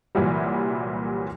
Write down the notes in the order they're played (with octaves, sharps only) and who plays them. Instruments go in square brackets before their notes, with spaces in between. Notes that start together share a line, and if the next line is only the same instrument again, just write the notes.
[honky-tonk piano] C2 A#2 E3 F#3 G3